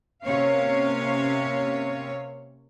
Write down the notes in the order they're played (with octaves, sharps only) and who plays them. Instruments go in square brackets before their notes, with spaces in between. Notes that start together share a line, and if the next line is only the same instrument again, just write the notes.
[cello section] C3 A#3 C#4 C#5 F5